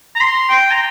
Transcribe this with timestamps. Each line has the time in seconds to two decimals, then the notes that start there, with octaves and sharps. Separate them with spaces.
0.16 A#5
0.21 C6
0.49 G5
0.71 A#5